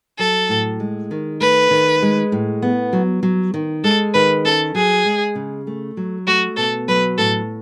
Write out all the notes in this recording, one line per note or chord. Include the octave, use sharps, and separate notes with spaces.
F#3 A4
A2
G#3
D#3
A3 B4
D#3
G#3
A2
B3
F#3
F#3
D#3
G#3 A4
D#3 B4
C#4 A4
F#3 G#4
G#3
C#3
A3
F#3
A3 F#4
B2 A4
F#3 B4
A2 A4